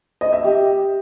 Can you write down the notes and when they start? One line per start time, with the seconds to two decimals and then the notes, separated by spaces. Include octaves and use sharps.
0.21 D#5
0.33 E5
0.44 G4